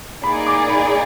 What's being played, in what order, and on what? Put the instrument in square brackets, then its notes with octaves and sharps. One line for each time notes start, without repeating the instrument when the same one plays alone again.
[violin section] A#3 D#4 G#4 D5 [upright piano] B5
[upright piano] D6
B5